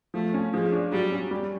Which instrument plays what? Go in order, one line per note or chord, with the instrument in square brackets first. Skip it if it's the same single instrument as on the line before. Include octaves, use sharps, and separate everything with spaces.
[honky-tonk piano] F3 [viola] A3
[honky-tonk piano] C#4
[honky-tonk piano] F3 [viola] G#3
[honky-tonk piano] D4
[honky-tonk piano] F#3 [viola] G3
[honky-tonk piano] C#4
G3